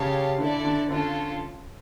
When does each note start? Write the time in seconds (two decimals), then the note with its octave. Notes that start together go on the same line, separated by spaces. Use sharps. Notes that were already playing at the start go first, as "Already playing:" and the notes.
Already playing: C#3 G4 C#5 F5 A5
0.38 D3 E4 A4 D5
0.65 D3
0.90 D3 C#4 F4 A4